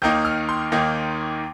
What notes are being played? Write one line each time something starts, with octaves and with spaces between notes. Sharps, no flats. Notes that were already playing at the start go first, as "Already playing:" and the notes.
D#2 D#3 A#3 D#4 G6
F6
C6
D#2 D#3 A#3 D#4